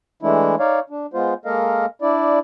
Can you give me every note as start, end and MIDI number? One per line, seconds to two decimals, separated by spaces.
0.23 0.55 52
0.23 0.55 56
0.23 0.55 57
0.23 0.55 62
0.23 0.55 64
0.60 0.80 63
0.60 0.80 73
0.60 0.80 74
0.60 0.80 77
0.90 1.06 62
1.14 1.34 56
1.14 1.34 59
1.14 1.34 65
1.14 1.34 72
1.45 1.86 56
1.45 1.86 58
1.45 1.86 69
1.45 1.86 70
1.45 1.86 75
1.45 1.86 77
2.02 2.39 62
2.02 2.39 64
2.02 2.39 74